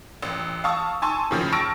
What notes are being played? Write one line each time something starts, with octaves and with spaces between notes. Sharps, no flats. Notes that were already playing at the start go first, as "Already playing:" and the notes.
A1
F5 A5 C#6 D#6 E6
G#5 A5 C6 C#6 E6
A2 C#3 F3
A5 C#6 E6 F6 A#6 D7